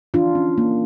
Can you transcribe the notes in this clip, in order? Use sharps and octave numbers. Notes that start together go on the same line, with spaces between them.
E3 D4 F4
C#4
A#3